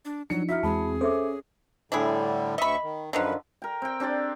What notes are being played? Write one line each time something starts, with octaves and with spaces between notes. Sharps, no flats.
D4
F3 F#3 D4 D#4 C#7
D#4 E4 F#4 E5 F6 B6
E2 G#3 C4 G#4 A5 B5
C#4 A4 C5 E5 D6
A2 D3 G3 D4 E4 G#4
D2 D#5 E5 B5 C#6
D#3
F#2 D3 D#3 F3 B4
A#4 G5
C4 G5
C4 D4 G4 D5